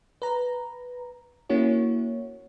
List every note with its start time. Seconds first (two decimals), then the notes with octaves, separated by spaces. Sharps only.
0.22 B4 A#5
1.49 A#3 C#4 E4 F#4 C#5